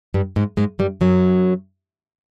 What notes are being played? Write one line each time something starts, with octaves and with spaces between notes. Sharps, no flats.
G2 G3
G#2 G#3
G#2 G#3
G2 G3
F#2 F#3